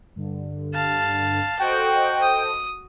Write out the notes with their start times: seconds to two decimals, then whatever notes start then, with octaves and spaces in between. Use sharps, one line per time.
0.16 G2 D3
0.74 F5 A5
1.59 F#4 A4 C5 D#5 G5
2.21 D#6